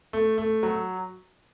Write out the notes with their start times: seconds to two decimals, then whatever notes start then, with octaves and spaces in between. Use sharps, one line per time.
0.13 A3
0.38 A3
0.63 F#3